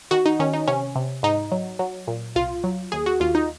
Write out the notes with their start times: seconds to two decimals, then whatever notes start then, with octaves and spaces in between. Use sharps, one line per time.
0.11 D#3 F#4
0.26 D#4
0.39 D#3 C#4
0.53 D#4
0.67 C3 C#4
0.96 C3
1.23 G#2 D#4
1.52 F#3
1.79 F#3
2.07 A#2
2.36 C2 F4
2.64 F#3
2.92 D#2 G#4
3.06 F#4
3.20 D#2 F4
3.35 D#4